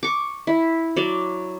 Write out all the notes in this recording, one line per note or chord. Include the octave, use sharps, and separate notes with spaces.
C#6 D6
E4
F#3 D5